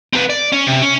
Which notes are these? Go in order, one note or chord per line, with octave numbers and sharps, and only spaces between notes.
C4 B4
D5
C#4
C3
C#4